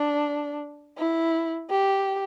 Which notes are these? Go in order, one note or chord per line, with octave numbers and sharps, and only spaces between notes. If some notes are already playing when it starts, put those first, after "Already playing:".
Already playing: D4
E4
G4